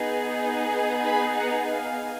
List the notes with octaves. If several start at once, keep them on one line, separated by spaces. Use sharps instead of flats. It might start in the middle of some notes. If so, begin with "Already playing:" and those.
Already playing: B3 D#4 G#4
G#5 B5
F#5 A#5
F5 G#5